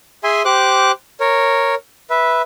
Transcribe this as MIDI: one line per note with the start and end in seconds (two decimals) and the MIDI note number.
0.24 0.42 68
0.24 0.42 76
0.24 0.42 80
0.24 0.42 84
0.45 0.92 67
0.45 0.92 72
0.45 0.92 86
0.45 0.92 90
1.20 1.75 70
1.20 1.75 73
2.10 2.42 71
2.10 2.42 76